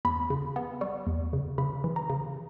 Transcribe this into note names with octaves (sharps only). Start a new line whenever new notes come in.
E2 B5
C#3
B3
G3 C#6
E2
C#3
C#3 B5
E3
A#5
C#3